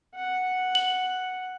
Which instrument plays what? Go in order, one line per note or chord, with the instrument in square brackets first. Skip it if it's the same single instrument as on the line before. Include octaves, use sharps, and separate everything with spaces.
[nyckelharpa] F#5
[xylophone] F#7